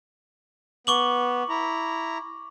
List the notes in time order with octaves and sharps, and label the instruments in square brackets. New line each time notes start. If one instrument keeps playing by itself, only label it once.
[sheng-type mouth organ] B3 [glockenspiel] C#6 D6 F#7
[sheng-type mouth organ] E4 A#5